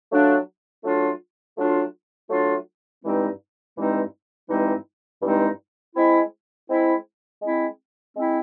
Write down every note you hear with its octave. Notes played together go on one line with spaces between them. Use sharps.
F#3 A3 D4 F4
F#3 A3 D4 F4
F#3 A3 D4 F4
F#3 A3 D4 F4
G2 E3 G#3 C4 D#4
G2 E3 G#3 C4 D#4
G2 E3 G#3 C4 D#4
G2 E3 G#3 C4 D#4
G#3 C4 E4
G#3 C4 E4
G#3 C4 E4
G#3 C4 E4